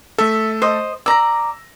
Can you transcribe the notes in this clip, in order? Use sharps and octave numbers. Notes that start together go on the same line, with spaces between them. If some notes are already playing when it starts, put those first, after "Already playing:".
A3 A4 E5
C5 D#5
D5 A#5 E6 A#6